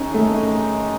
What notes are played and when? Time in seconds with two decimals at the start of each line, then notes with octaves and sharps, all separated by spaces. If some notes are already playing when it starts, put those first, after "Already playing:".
Already playing: F#2 D#3 G#3 C#4 D#4
0.14 A3